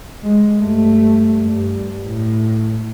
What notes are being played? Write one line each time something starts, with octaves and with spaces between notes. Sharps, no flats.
G#3
G2 A3
G2
A2